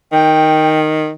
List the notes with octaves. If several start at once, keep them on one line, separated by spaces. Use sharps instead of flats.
D#3 G5